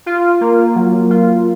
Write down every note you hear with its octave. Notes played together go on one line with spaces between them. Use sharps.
F4
A#3
F#3
F4